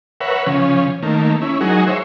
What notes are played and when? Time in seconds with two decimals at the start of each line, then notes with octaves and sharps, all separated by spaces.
0.21 A#4 B4 C#5 E5 F#5
0.46 C#3 F3 C#4
1.03 D#3 A3 A#3
1.42 C#4 E4
1.61 F#3 G#3 D#4 F#4 G#4 A#4
1.87 C5 C#5 E5